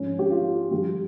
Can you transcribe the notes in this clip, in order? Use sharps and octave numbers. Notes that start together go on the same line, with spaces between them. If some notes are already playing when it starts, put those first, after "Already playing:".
Already playing: G#2 F3 G#3 C#4
G4
F4
G2 F3 G#3 G4